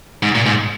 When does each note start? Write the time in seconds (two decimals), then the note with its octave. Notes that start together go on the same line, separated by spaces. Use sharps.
0.23 G#2
0.35 A#2
0.46 G#2